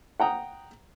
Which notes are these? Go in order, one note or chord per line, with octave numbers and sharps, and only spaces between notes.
F#5 G5 A#5 D#6